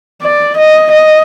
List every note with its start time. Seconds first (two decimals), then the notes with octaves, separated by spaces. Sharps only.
0.22 D5
0.57 D#5
0.92 D#5